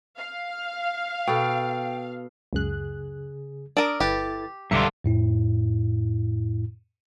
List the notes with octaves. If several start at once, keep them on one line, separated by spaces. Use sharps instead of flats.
F5
B2 A4 G5
C#2 F#2 C#3 G#4 F#6
D4 A#4 D5 D#6 E6
G1 E4 G4 A4 B4 A6
B1 G2 D3 F4 E5 A#5 C#7
F2 A2 E4